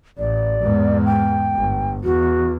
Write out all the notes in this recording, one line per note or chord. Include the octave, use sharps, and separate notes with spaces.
A1 D5
E2 G#2
G5
G1
E2 F#4